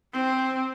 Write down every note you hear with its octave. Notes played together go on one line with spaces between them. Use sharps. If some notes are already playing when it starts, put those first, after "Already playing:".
C4